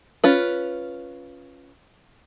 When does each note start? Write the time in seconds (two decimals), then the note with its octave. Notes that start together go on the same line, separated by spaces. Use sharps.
0.24 C#4 F4 B4